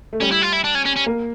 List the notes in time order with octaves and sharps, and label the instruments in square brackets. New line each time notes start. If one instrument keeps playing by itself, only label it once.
[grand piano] A3
[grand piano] G3 [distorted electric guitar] C#4
[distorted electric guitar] E4
F4
E4
D4
C#4
C#4
C#4
[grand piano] A#3